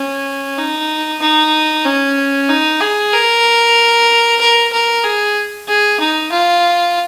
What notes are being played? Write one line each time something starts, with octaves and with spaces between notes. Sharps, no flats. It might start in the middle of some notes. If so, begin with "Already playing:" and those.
Already playing: C#4
D#4
D#4
C#4
D#4
G#4
A#4
A#4
A#4
G#4
G#4
D#4
F4